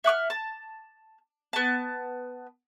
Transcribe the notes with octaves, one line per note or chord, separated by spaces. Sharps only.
E5 F#5 D6 F6
A5
B3 A5